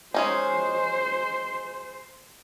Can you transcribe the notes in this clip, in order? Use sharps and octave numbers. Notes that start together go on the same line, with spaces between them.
G#3 C#4 D#4 C5